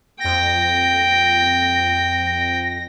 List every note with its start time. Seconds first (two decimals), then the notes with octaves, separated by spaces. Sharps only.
0.20 F2 G5 A#6